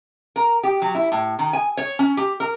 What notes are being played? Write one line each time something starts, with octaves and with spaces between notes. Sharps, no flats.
A#4
G4
F#3
E4
A2
D#3
G#5
C#5
C#4
G4
A#4